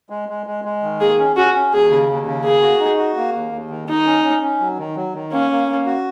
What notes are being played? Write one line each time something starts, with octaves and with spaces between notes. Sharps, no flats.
G#3
G#3
G#3
G#3
D#3
A#3 G#4
C#4
C#4 F#4
C#4
D#2 G#4
C#3
D#2
C#3
A#3 G#4
F#4
D#4
F#4
A#3
D#2
D#2
D#3
D#3 D#4
C#4
C#4
C#4
F#3
D#3
F#3
D#3
A#3 C#4
A#3
A#3
F#4